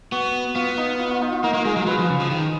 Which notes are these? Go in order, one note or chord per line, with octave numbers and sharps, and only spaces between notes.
B3 F#4
B3 F4
D#4
F4
F4
D#4
F4
A#3 D#4
A#3 F4
G#3 G#4
F#3 A#4
F#3 B4
F3
C#3
F3
D#3